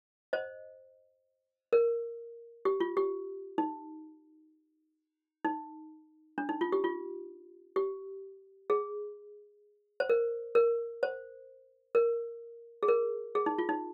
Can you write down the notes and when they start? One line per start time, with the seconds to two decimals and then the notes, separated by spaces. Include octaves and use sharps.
0.33 C5 D#5
1.73 A#4
2.65 G4
2.80 F4
2.97 G4
3.58 D#4
5.45 D#4
6.38 D4
6.49 D#4
6.61 F4
6.72 G4
6.84 F4
7.76 G4
8.70 G#4
10.00 C5
10.09 A#4
10.55 A#4
11.03 C5
11.95 A#4
12.83 G#4
12.88 A#4
13.35 G#4
13.46 D#4
13.58 F4
13.69 D#4